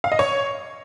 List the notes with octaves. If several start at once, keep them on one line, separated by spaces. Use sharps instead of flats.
F5
D#5
C#5